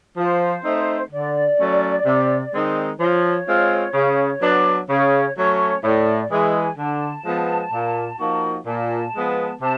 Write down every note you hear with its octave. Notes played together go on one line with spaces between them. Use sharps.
F3 C5
A3 C4 D#4
D3 D5
F#3 A3 C#4
C3
D#3 G#3 C4 D#4
F3 C#5
G#3 C4 F4
C#3
F#3 B3 D4
C#3 C#5
F#3 A3 C#4 C#5
A2 D5
E3 G#3 G#5
D3 A5
F3 G#3 B3
A#2
F3 A#3 D#4 F#4
A#2 A5
F3 G#3 B3
C3 A5